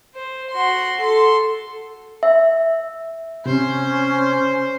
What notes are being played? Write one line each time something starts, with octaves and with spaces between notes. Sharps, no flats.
C5
F#4 C6
A4 C6
E5
C3 C#4 C5